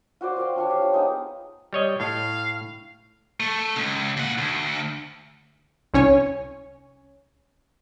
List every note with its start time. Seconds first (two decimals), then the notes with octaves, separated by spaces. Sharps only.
0.21 F4 F#4 C5 D5
0.36 F4 C5 F5 G5
0.56 D4 F4 C#5
0.69 G4 F5
0.82 F4
0.94 G#3 B3 D#4
1.73 G3 C#5 D#5
2.00 A2 F5
3.40 A3
3.76 C#2
4.17 A#2 F#5
4.38 D2
5.93 C2 C#4 C#5 G#5